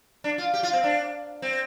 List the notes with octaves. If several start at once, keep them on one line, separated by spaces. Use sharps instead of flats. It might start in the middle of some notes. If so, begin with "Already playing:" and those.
D4
F4
G4
F4
C4
D4
C4